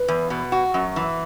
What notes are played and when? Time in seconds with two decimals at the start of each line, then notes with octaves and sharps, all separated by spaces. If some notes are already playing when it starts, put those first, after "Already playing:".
Already playing: B4
0.08 E2
0.30 B2
0.52 F#4
0.74 F#2
0.96 E3